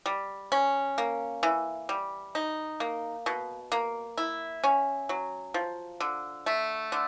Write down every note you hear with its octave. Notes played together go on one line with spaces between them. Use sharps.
G3
C#4
A#3
E3
G3
D#4
A#3
B2
A#3
E4
C#4
F#3
F3
D3
A3
D3